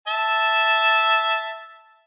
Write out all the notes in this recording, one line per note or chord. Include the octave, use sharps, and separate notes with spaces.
E5 A5